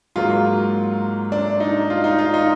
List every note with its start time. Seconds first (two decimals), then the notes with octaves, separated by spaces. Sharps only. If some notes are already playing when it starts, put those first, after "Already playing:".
0.16 G#2 F#3 A#3 F4
1.32 D4
1.60 D#4
1.90 F4
2.04 D#4
2.19 F4
2.34 D#4